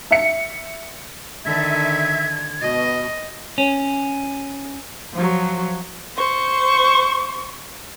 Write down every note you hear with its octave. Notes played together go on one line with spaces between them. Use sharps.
E5 C#7
D3 D#3 E5 G#6
B2 D#5
C#4
F3 F#3
C5 C#6